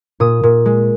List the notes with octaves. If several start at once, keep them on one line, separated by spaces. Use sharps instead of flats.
A#2 D#6
A#2
G#3